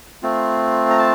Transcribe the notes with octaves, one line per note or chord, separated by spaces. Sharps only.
A3 C4 F4
A#5
A5